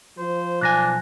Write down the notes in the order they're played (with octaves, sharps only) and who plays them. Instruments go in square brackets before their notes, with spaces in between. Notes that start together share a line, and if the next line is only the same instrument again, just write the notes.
[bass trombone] F3 [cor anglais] C5
[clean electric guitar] B1 G#5 [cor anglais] D4 [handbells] F#6 A#6